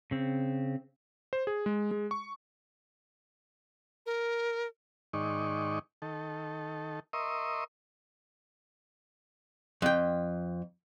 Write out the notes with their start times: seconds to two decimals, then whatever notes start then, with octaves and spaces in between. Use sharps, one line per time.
0.11 C#3 C4
1.33 C5
1.47 G#4
1.66 G#3
1.91 G#3
2.11 C#6
4.06 A#4
5.13 G#2 D#3 D#4 D5 C#6
6.02 D#3 A4
7.13 A#4 D#5 E5 C6 C#6 D#6
9.82 F2 G5